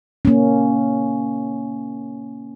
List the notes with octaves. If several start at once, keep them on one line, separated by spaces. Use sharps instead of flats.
A#3 C#4